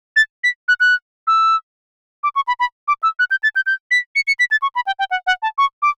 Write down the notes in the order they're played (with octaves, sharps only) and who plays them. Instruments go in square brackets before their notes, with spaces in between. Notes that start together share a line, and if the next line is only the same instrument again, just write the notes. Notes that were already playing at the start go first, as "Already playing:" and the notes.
[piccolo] A6
B6
F#6
F#6
E6
D6
C#6
B5
B5
D6
E6
F#6
G6
A6
G6
G6
B6
C#7
C#7
B6
A6
C#6
B5
G5
G5
F#5
F#5
A5
C#6
D6